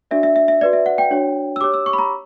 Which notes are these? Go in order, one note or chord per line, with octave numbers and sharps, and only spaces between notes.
D4 F#4 A#4 D5 E5
E5
E5
E5
F#4 B4 D5
E5
F#5
G5
D4 F#4 C#5
E6
G4 C#5 D6
E6
C#6
B5
A#5